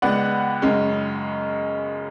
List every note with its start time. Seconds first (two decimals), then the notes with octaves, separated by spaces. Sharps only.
0.02 C#2 C#3 G#3 B3 D5 F#5
0.62 F#2 C#3 G#3 C#4